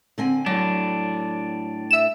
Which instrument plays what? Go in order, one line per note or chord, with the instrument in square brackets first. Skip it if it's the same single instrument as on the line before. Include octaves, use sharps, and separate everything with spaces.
[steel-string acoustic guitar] D3 C4 G#5
[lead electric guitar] A2 D4 [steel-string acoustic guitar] F#3
[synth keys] E5 E7